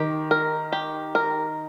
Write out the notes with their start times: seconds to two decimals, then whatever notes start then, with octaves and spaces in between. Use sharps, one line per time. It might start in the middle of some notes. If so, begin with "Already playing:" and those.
Already playing: D#3 G4
0.31 A#4
0.72 G4
1.15 A#4